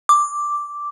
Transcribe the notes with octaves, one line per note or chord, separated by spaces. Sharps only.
D6